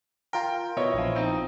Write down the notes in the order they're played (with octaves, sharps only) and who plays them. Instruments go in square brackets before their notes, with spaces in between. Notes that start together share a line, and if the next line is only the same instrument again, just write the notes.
[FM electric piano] F4 A#4 [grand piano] G5
[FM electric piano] B2 [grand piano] E4 C#5 D#5
[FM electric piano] A#1 F3
[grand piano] C4 D#4